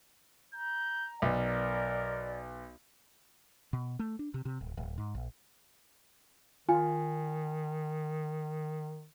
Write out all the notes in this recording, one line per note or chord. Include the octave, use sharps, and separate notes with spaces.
A#5 G6
B1 A#4 D5
B2
A3
D4
C3
C3
D1
D1
G#2
A#1
D#3 F4 G#5